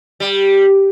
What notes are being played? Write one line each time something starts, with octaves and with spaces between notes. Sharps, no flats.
G3